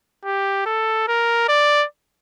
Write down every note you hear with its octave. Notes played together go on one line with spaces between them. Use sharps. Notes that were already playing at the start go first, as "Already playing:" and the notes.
G4
A4
A#4
D5